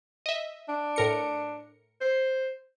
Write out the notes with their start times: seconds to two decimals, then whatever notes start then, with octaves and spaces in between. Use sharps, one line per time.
0.26 D#5 E5
0.69 D4
0.96 A2 A#4 C#7
2.01 C5